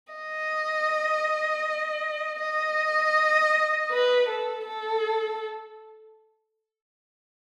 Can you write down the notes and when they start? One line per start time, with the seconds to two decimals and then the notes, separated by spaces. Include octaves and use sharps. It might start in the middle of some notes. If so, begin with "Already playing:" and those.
0.13 D#5
2.40 D#5
3.91 B4
4.28 A4
4.66 A4